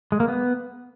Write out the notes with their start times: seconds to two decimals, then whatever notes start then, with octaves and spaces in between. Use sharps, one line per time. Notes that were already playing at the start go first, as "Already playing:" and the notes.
0.12 G#3
0.20 A#3
0.28 B3